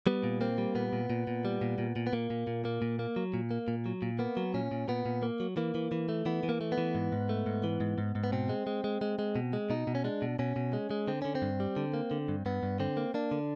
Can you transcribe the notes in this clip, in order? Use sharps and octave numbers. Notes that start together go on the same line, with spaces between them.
G3 B3
A#2
A#3 C4
G3
A#2 B3
A#2
A#2
A#2
G3
A#2
A#2
A#2
B3
A#2 A#3
A#2
A#2
A#3
A#2
A#3
F#3
A#2
A#3
A#2
F#3
A#2
A#3 B3
F#3
A#2 C#4
A#2
A#2 B3
A#2
A#3
F#3
E3 A#3
E3
E3
A3
E3 B3
E3
A#3
A3
B3
E3
G#2
G#2
A3
G#2
E3
G#2
G#2
G#2
B3
B2 C4
G#3
G#3
G#3
G#3
G#3
B2
G#3
B2 D#4
B2
C#4
G#3 D4
B2
B2 C#4
B2
G#3
G#3
D3 C4
D3 C#4
C4
G2
G3
D3
A#3
D3
G2
G2 B3
G2
D3 C4
A#3
A#3 D4
D3